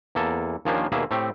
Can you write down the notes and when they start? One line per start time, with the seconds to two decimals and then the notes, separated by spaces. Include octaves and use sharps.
0.15 E2 A#3 A4 A5
0.65 D#2 F3 A#3 C#4 D4 C5
0.92 D#2 B2 A#3 G#4 E5
1.11 A2 A3 C4 G4